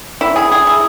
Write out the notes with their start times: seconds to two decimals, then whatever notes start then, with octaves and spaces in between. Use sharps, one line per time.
0.21 E4
0.36 G#4
0.52 G#4
0.67 E4